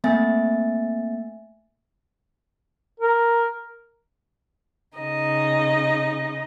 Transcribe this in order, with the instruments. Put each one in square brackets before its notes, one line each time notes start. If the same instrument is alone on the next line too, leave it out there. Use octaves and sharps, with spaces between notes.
[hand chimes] A3 A#3 C4 E5 G#5 A6
[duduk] A#4
[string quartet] C#3 D#4 D#5